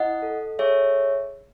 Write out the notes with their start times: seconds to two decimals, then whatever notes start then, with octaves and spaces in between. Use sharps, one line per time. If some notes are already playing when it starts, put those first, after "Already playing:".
Already playing: E4 D#5 F#5
0.22 A4
0.59 G#4 C#5 E5